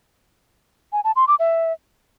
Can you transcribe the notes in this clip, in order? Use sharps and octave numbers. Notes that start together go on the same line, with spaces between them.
G#5
A5
C6
D6
E5